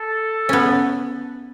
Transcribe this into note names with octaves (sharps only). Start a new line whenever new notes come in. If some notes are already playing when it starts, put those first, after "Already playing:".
Already playing: A4
B3 C#4